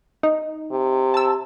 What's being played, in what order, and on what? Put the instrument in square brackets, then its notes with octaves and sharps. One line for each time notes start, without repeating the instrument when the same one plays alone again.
[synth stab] D#4
[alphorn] C3
[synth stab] A5 E6